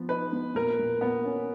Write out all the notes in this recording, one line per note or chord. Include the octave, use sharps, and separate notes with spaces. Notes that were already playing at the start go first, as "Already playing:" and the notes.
Already playing: F3 B3
D#4 B4
B3
A#2 A#4
A#2
A#2 B3
C#4